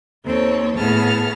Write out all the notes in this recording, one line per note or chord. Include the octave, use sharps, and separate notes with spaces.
D#2 C4 A4 C#5
A2 B3 G#4 A5 F6